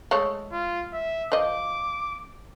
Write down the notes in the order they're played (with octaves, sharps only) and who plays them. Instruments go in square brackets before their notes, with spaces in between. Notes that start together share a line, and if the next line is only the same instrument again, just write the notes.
[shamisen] G#3 A3 C#5
[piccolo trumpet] F4
E5
[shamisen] F3 D#5 [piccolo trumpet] D6